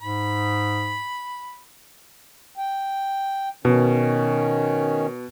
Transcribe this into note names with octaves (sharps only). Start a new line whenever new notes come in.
G#2 B5
G5
B2 D#3 C#4